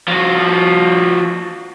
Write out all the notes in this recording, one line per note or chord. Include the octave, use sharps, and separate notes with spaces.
F3 F#4